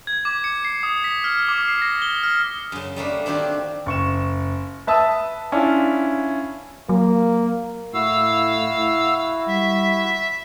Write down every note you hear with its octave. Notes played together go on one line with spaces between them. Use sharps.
G#6
D6
C#7
C7
D#6
B6
F6
D6
C7
A#6
G7
F6
F#2 C#3
G3 A3 A#3 D4
D#3 C4 D4 F#4 G4
F#1 C#6 E7
B4 E5 A5 D#6 E6
C#4 D4 E4 F4 D5
F#3 A#3
A2 E4 F#4 F5 E6
G3 E5